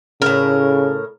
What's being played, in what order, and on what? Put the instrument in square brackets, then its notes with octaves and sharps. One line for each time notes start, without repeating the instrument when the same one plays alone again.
[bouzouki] A2 A#4 [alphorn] C#3